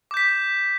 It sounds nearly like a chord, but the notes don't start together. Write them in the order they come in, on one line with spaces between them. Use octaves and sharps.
D6 G6 B6